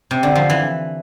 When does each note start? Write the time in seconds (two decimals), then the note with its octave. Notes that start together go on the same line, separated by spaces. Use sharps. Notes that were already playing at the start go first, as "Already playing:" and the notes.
0.11 C3
0.23 D3
0.36 F3
0.50 E3